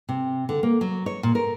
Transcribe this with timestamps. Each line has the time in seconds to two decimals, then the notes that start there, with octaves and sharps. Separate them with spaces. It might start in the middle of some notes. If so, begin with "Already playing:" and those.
0.09 C3
0.49 D3
0.63 A#3
0.81 F#3
1.06 C#5
1.23 A#2
1.35 A#4